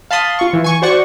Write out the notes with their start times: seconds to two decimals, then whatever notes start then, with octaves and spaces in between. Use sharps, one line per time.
0.11 F5 A5 B5 C6 D#6
0.39 F4 C#6
0.53 E3
0.64 G#5 C#6
0.82 F#4 C5 D5 F#5 C#6